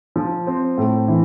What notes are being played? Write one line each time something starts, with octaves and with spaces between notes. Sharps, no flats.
F3
C4
A2
E3